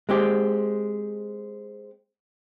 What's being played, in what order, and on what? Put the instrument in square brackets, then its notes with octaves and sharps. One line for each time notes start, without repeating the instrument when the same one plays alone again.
[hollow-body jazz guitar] G#3 C4 G4